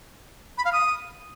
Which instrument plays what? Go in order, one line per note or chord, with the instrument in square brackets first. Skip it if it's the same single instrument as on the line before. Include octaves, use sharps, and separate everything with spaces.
[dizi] B5
F5
D#6